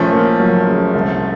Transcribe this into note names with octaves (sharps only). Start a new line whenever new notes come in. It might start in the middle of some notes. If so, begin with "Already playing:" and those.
Already playing: A#1 F3 A3 C#4
A#3
F#3
C#3
C2